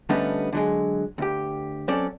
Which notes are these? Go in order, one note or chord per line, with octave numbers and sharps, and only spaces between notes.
D3 G3 A3 B3 C#4 D#4
D3 F#3 G#3
D2 G4
F#3 C4 C#4 A4 D5